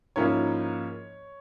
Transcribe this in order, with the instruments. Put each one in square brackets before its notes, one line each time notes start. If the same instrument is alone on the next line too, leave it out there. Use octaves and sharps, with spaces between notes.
[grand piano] G#2 F3 A#3 C#4 E4 C#5